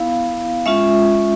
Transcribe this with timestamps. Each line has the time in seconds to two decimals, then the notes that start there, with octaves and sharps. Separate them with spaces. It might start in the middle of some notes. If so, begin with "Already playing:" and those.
Already playing: B3 E4 F5
0.66 G#3 C#4 F4 E5